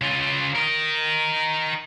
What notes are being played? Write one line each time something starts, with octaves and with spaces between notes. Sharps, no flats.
C#3 F4
A#4 D#5